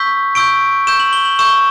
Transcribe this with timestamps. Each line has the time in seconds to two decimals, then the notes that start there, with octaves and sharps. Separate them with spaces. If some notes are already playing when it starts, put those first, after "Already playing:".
Already playing: C#6 E6 G6 B6
0.35 C#6 E6 G6 D7
0.87 C#6 E6 G6 E7
1.00 F#7
1.13 G7
1.25 F#7
1.39 C#6 E6 G6 E7